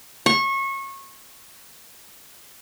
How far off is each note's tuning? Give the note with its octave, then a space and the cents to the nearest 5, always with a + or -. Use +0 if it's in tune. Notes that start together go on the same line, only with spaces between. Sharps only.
C#6 -25